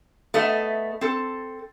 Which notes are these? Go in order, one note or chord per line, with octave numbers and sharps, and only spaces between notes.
A3 B3 D#5 E5
C4 A4